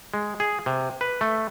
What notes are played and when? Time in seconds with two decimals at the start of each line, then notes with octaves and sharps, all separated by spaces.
0.14 G#3
0.40 G#4
0.66 C3
1.01 B4
1.21 A3